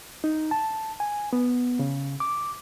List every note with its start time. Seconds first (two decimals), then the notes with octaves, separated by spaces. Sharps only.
0.24 D#4
0.51 A5
1.00 G#5
1.33 B3
1.79 C#3
2.20 D6